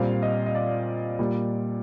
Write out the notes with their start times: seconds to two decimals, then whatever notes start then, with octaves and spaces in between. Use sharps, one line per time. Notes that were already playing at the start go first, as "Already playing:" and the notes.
Already playing: A#2 G3 C4 F5
0.22 D#5
0.46 D#5
0.55 D5
1.19 A#2 G3 A#3